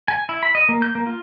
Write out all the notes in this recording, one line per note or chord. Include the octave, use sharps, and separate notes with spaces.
G#5
E4
B5
D#5
A#3
G6
A#3
F4